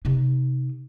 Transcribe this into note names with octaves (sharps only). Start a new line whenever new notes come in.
C3 D#4